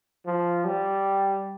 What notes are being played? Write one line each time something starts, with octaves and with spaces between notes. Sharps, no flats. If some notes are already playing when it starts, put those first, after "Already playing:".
F3
G3